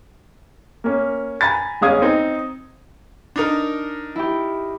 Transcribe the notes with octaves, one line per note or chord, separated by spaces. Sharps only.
A#3 C#4
G#5 A#5 B5 A6
G1 G#3 C#4 F5 D#6 G#6
C4 D#4
D4 D#4 A#4
E4 G4